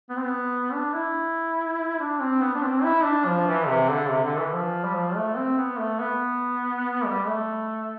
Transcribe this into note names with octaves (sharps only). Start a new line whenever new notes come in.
B3
C4
B3
D4
E4
D4
C4
B3
D4
C4
E4
D4
F3
E3
C3
D3
C3
D3
E3
F3
G3
F3
A3
C4
B3
A3
B3
G3
A3